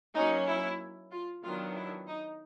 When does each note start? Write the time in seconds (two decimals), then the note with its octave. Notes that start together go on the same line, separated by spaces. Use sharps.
0.15 F#3 A#3 C#4 D#4
0.47 E4
1.11 F4
1.43 D#3 F#3 B3 D4 F4
1.75 E4
2.07 D#4